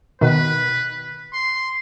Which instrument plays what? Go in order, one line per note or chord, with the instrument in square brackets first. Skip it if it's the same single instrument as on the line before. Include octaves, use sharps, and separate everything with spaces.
[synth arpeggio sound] B2 D#3 [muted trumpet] B4
[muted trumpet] C6